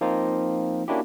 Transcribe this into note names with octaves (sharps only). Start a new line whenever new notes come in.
F3 A#3 C4 D#4 F4
A#3 C#4 D4 E4 F#4 G4